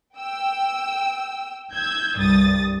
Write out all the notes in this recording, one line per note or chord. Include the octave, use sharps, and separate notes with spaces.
G5 E6
E6 G6 G#6
C2 G2 D#6 A6